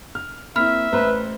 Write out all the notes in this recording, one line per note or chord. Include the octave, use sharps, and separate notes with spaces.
F6
A#3 C4 E4 E5 B5 F6
A1 B4 C5 A#5